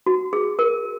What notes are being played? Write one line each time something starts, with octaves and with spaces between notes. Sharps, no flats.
F#4
G#4
A#4